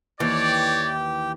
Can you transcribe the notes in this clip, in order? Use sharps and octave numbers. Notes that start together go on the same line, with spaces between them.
D#2 E3 G4 C#5 D5 G5